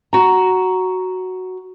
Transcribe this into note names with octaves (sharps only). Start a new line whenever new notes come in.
F#4 A#5